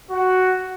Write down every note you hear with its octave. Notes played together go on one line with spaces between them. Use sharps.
F#4